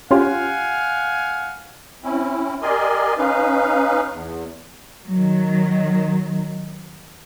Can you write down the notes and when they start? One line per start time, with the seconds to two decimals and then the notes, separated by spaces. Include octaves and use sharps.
0.11 C#4 F4 G4 F5 F#5 G#5
2.04 C4 C#4 E4
2.62 G4 A#4 D5 D#5 G#5 C6
3.18 C#4 D#4 B4 F5
4.13 E2
5.08 D#3 F#3